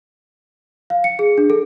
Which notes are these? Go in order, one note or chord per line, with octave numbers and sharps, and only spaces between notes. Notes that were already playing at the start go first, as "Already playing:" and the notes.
F5
C#7
G#4
D4
A4